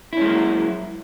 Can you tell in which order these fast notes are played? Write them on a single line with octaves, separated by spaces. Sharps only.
E4 C#4 G#3 A#3 F#3